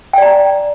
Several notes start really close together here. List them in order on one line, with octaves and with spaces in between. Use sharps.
G5 D5 A#5